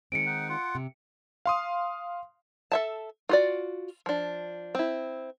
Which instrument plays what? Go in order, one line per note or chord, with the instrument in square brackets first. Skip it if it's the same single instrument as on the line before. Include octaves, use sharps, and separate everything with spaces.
[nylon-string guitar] D#3 G#3 C4 [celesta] C#7 D7
[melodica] D#4 F#5
F4 F#5
[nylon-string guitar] C3
[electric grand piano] F5 C6 D#6
[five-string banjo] A4 E5 A5
F4 F#4 D5
F3 D4
C4 E4